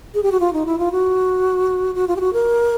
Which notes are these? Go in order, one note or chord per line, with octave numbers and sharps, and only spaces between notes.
G#4
G4
F#4
F4
D#4
E4
F4
F#4
F#4
F4
G4
F#4
A#4